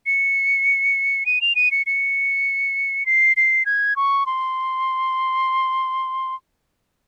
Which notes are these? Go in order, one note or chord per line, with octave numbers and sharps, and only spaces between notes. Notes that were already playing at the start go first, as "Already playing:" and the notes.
C#7
D#7
F7
D#7
C#7
C#7
C7
C7
G#6
C#6
C6